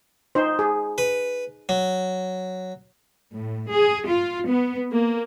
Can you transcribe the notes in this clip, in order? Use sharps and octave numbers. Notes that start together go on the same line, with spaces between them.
D#4 C5
G#4
B4
F#3
A2
G#4
F4
B3
A#3